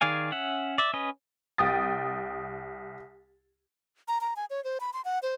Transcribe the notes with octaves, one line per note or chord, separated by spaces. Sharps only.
D#3 G#4 D5 F5 G#5
C#4 E5 F#5
D5 E5
C#4 B4 D#5
C2 G5 D#6 A6
A#5
A#5
G#5
C#5
C5
B5
C6
F#5
C5